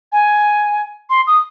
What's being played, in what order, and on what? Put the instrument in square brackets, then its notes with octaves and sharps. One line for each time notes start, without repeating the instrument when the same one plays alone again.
[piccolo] G#5
C6
D#6